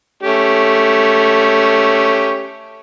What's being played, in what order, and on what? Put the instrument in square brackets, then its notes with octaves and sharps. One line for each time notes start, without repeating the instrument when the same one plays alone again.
[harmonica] A3 C#4 G4